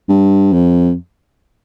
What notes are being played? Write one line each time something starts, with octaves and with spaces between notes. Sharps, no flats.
G2
F2